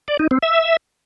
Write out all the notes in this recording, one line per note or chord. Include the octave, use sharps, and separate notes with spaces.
D5
D#4
C4
E5